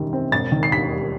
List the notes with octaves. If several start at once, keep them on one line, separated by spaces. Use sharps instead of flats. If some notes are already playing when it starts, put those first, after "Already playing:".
Already playing: E1 F#2 D#3 G3
C4
E1 A6
D#3
C7
D#2 B6
G3